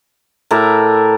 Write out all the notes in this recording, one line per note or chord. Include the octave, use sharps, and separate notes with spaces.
A2 A#4 E5 D6